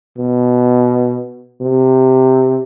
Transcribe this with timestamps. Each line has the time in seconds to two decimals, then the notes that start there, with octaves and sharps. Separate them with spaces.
0.18 B2
1.61 C3